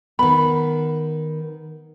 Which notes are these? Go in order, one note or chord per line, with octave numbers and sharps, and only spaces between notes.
D#3 B3 B5